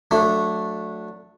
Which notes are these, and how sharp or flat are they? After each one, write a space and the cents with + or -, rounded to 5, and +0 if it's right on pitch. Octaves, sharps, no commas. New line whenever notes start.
F#3 -25 A3 +0 D4 +0